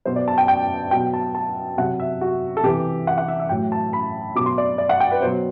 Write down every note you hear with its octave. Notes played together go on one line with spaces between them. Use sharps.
B2 F#3 C5
D5
A5
G5
G5
B2 F#3 G5
A5
A5
C3 F#3 F#5
E5
F#4
A4
C3 E3 G4
F#5
F#5
E5
E5
A2 F#3 G5
A5
B5
B2 F#3 D6
C6
D5
D5
F#5
G5
B4
B2 F#3 C5